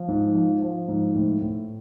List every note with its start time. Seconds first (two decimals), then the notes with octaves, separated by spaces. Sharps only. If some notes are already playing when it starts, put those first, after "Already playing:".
Already playing: F3
0.08 G#2
0.35 F3
0.62 F3
0.88 G#2
1.15 A2
1.42 A2